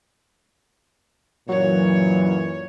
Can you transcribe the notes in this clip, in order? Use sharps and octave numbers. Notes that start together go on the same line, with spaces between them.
F#2 A#2 E3 F#3 C#5